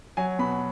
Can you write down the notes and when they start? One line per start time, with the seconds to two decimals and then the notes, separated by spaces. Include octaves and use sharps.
0.17 F#3 G#5
0.39 B2 B5